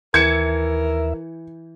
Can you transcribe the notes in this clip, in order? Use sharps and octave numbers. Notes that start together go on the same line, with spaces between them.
D#2 E3 A#4 E5 A5 G#6 C#7